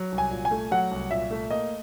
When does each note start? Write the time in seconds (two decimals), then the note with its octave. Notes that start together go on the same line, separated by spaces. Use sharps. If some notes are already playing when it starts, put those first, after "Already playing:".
Already playing: F#3
0.12 C2
0.18 G#5
0.31 A#2
0.45 G#5
0.51 A3
0.71 F#3 F#5
0.91 C2
1.11 A#2 E5
1.31 A3
1.50 A#3 D#5